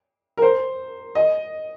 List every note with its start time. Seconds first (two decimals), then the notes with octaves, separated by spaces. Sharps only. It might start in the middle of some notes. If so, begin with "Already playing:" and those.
0.37 A#4
0.42 C5
1.15 D#5